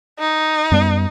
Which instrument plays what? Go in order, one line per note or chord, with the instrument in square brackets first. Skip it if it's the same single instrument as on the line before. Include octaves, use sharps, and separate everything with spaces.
[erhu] D#4
[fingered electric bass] F#2 G3 B3